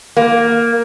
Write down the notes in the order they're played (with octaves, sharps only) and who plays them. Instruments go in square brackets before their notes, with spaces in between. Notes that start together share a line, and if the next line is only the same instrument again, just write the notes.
[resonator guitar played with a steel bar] A#3